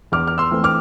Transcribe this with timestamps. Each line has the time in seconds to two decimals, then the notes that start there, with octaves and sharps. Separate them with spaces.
0.12 E2 D6 F6
0.27 F6
0.38 C6 E6
0.51 E3 A3 C4
0.64 D6 F6